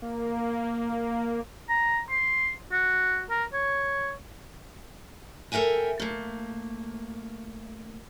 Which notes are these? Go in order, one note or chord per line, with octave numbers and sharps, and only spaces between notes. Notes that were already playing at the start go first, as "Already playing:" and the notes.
A#3
A#5
C6
F#4
A#4
C#5
A4 A#4 E5 G5 G#5
A3 A#3